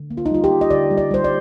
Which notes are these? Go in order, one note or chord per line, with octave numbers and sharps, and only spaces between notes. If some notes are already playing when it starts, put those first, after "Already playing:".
Already playing: D3
A#3
F4
D#4
G3 F4
G4
A#3
D#5
D3 D5
G3
D5
G3 C5
D5